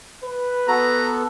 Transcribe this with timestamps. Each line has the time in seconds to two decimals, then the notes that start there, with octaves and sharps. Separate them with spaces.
0.24 B4
0.68 B3 F#4 A4 A#5